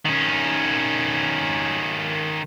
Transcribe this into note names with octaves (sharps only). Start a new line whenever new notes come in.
D#3 C#4